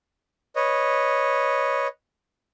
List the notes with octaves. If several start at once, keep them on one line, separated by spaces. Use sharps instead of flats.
B4 C#5 D#5